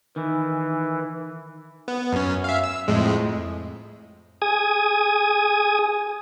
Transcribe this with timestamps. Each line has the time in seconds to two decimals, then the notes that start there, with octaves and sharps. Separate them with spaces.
0.16 D#3 E3
1.88 B3
2.13 F#2 C#4
2.44 E5 F5
2.64 E6
2.88 F2 A2 G#3
4.42 G#4 G#5 D#6